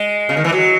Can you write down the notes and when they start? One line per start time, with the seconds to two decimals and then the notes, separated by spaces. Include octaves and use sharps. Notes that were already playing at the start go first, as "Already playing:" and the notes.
Already playing: G#3
0.29 C#3
0.37 D#3
0.44 E3
0.52 F#3